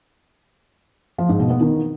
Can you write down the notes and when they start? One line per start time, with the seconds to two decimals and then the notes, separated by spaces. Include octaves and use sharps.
1.18 F3
1.29 G#2
1.40 B2
1.50 B3
1.61 D#3